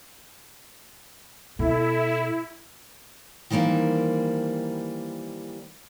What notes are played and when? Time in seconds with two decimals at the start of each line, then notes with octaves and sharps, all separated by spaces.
1.59 B2 E4 A4
3.50 D#3 E3 G3 A#3 C5